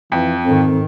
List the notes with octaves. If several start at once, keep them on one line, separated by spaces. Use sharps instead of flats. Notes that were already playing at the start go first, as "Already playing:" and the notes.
F2 E3
G#2 D#3 C4 A4